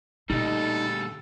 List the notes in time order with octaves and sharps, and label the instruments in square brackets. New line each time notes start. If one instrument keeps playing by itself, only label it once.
[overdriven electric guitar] D2 G3 [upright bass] A#2 D3 [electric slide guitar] D#4 D#5 [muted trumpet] A4